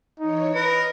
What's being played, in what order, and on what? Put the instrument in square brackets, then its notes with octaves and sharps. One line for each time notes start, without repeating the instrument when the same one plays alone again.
[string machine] E3 C#5 [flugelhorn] D#4
[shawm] A#4 [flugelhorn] B4 [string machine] D#5